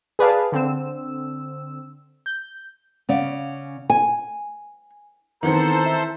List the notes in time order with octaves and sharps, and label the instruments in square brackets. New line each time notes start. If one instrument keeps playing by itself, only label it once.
[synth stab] G#4 B4 D5 F5 A5
D3 C4 E6
G6
[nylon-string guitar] C#3 C#4 D5 [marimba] F5 F#5
[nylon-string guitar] G#5
[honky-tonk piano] D#3 E3 C4 [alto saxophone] B3 [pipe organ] A4 C5 [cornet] A#5
[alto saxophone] E5